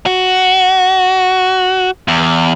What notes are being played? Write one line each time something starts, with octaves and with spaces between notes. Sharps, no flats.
F#4
E2